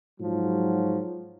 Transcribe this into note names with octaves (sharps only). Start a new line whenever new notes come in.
G#2 F3 F#3